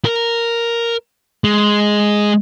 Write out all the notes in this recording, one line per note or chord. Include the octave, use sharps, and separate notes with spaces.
A#4
G#3